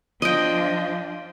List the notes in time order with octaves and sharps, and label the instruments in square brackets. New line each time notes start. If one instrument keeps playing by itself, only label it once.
[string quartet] F3 D4 [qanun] D#5 G5